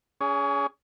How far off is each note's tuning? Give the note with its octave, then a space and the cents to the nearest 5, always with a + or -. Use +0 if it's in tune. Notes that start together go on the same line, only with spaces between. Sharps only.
C#4 +30 G#4 +0